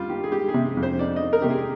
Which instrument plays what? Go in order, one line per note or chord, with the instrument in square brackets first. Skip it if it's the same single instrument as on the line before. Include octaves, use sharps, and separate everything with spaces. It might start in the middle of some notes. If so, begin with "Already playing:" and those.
Already playing: [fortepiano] G3 F4
D#3 G4
G#4
G#3 G4
G#4
C3
F2
C5
D#4 D5
D#5
D#3
A#4
C3 G4
G#4